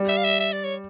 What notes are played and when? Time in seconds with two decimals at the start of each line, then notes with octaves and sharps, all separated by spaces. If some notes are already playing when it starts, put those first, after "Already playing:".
Already playing: G3
0.09 E5
0.17 F5
0.24 E5
0.40 E5
0.53 D5
0.64 C#5